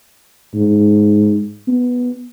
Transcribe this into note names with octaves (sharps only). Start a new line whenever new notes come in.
G#2
B3